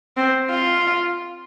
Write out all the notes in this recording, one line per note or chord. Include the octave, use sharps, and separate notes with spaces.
C4
F4